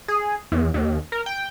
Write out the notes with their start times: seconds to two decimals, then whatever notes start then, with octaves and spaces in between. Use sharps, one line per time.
0.08 G#4
0.52 E2
0.74 D#2
1.12 A#4
1.26 G5